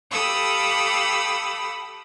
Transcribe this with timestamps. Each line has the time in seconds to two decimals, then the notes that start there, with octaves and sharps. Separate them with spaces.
0.11 G4 A4 F5 B5 D#6 E6